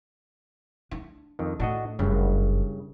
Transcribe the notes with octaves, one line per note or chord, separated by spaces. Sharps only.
D4
F2 D#3
A2 D4 F#4 D#5
F#1 G2 C#3